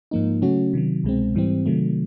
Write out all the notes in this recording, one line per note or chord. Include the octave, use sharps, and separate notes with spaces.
G#2 F3 A#3 D#4
C#3 F#3 A3 C#4 F#4
C3 D#3 F#3
C2 B2 G#3 C4
G#2 E3 G3 C4
C3 D#3 F#3 A3